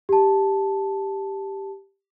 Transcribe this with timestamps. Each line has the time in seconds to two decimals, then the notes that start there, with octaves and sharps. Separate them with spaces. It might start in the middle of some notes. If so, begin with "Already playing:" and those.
0.09 G4 A5